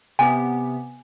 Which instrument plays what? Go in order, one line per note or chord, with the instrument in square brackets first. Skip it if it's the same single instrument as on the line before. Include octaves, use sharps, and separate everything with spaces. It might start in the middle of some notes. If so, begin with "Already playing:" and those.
[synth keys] C3 B3 G4 [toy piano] G#5